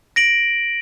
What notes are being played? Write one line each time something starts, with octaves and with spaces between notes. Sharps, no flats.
A#6 D7 F#7